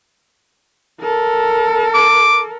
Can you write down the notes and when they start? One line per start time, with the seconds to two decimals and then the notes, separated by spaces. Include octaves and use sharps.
1.01 A4 A#4
1.94 D6